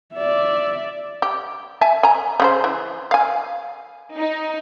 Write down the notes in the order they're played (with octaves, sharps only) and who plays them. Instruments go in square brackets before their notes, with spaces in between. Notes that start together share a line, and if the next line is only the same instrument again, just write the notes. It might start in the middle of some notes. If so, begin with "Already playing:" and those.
[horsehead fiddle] D5 E5
[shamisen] G4
E5 G#5 A5
G#5 A#5
C#3 F#4 C5
E3
F5 G#5
[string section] D#4